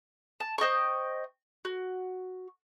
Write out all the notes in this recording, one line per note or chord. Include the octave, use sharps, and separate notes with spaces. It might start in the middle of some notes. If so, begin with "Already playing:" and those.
A5
C5 D#5 G5 C#6
F#4